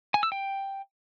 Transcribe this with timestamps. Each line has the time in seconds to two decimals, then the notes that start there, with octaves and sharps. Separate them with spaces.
0.14 G#5
0.23 E6
0.32 G5